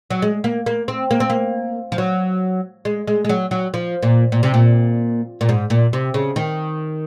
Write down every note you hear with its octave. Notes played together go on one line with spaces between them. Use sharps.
F#3
G#3
A#3
A#3
C4
A#3
C4
A#3
F3
F#3
G#3
G#3
G#3
F#3
F#3
F3
A#2
A#2
C3
A#2
A#2
G#2
A#2
C3
C#3
D#3